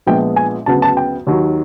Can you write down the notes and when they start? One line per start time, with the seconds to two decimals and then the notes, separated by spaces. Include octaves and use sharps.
0.06 A#1 A#2 F3 G#3 B3 G5
0.36 G#5
0.66 D2 C#3 F#3 B3 A5
0.82 A5
0.97 G5
1.27 D#2 D#3 F#3